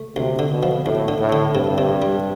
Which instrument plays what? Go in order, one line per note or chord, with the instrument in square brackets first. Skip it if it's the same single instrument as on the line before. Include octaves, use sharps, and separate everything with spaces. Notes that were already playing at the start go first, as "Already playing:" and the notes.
Already playing: [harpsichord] A3
[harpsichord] D2 [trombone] C3
[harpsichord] D3
[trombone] B2
[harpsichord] F3
[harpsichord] D2 [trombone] A2
[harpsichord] D3
[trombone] A2
[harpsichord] D3
[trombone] G2 [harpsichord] C3
[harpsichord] C3
G3